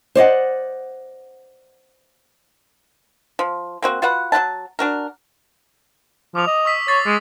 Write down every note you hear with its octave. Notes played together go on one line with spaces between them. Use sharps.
C5 D5 D#5 F#5
F3
A#3 C4 F#4
F4 F#4 B4 F#5
F#3 E4 F#5 A5
D4 F#4 A#4
F3 D6 D#6 F7
D#5
C#6 E6 B6
C#5 A6 C7
G#3